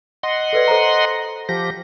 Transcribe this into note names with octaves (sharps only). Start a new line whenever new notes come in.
D#5 F#5 C6
A4 B4 D5
A4 C5 A#5
F3 G4 A#6